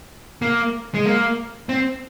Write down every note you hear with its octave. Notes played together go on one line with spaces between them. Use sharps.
A#3
G#3
A#3
C4